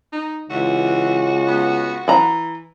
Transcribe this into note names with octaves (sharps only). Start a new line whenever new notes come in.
D#4
C#2 E3 F#4
B3
E3 A#5 B5